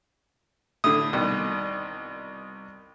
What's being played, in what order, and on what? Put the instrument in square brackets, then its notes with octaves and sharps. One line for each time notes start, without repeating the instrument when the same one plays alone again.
[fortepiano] A2 D3 [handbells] D#6
[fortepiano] C2 B2 D#3